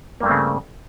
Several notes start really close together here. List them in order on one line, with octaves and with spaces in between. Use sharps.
A#3 G2 A3 C4 C#3